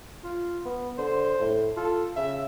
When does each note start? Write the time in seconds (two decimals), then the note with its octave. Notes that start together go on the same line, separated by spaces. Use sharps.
0.24 F4
0.65 B3
0.98 D3 C5
1.40 A2
1.77 F4 A4
2.16 C#3 E5